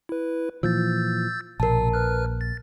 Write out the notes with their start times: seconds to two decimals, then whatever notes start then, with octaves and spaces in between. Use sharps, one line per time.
0.09 E4 B4
0.63 A#2 E3 F3 E6 G6 A6
1.60 A#1 B2 A#4 A5
1.93 B4 F6 F#6
2.41 A6